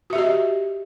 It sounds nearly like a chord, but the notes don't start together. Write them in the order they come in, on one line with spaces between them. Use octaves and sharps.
F#4 E5 G4 D#5